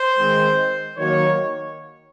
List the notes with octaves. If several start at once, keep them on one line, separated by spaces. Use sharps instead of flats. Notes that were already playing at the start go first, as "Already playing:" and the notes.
Already playing: C5
D#3 G#3 C4
D#3 F#3 A#3 C#5